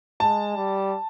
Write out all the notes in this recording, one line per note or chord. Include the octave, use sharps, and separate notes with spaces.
G#3 A5
G3